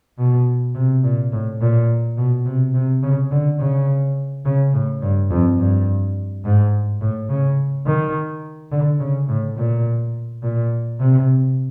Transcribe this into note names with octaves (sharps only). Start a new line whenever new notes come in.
B2
C3
A#2
A2
A#2
B2
C3
C3
C#3
D3
C#3
C#3
A2
G2
F2
G2
G#2
A2
C#3
D#3
D3
C#3
A2
A#2
A#2
C3